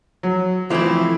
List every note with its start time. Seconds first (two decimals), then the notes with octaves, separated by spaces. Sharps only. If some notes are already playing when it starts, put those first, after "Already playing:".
0.23 F#3
0.70 E3 F3 A3 C4 E4